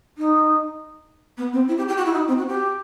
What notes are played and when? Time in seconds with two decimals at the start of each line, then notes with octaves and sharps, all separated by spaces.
0.18 D#4
1.37 B3
1.53 C4
1.68 E4
1.77 G4
1.88 G4
1.97 F#4
2.05 E4
2.13 D#4
2.28 C4
2.37 F#4
2.48 G4